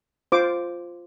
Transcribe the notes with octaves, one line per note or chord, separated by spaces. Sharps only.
F4 C5 D6